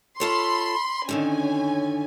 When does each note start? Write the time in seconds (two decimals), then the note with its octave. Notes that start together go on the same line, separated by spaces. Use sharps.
0.20 F4 A4 C#5 B5 C6
1.09 F#2 D3 D#3 C#4 G#5